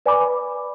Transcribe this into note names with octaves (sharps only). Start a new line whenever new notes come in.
B4 D5 G#5 B5 D6